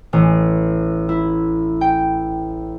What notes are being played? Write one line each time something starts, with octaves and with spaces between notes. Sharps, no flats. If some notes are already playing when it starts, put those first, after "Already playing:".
A1
E4
G5